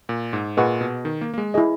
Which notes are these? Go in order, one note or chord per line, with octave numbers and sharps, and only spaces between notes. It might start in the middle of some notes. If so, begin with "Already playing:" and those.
A#2
G#2
A#2 G#4 B4 D#5 F#5 C#6
B2
D#3
A#3
A#3
G#3
E4 G#4 D#5